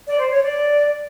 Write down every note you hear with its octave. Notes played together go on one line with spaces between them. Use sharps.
D5
C5
C#5
D5